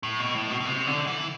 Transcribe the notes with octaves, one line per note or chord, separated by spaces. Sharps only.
A2
B2
A2
B2
B2
C3
D3
E3